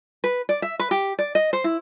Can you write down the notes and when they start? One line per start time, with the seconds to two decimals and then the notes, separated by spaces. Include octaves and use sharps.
0.24 B4
0.49 D5
0.62 E5
0.80 B4
0.91 G4
1.19 D5
1.35 D#5
1.53 C5
1.64 E4